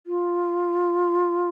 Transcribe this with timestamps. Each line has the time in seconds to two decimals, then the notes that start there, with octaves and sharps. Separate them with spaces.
0.07 F4